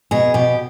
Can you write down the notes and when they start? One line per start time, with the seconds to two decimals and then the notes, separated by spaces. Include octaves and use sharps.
0.11 B2 G#4
0.34 B2 G4